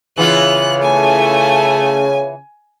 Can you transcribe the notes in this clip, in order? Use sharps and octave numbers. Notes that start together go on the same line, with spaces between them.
C#3 E3 B3 F4 F#6
A3 G#5